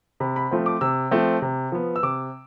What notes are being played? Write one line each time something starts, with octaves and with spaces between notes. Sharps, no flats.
C3 B5
B5
F3 A3 C4
D6
C3 E6
F3 A3 C4
C3
F3 B3
E6
C3 D6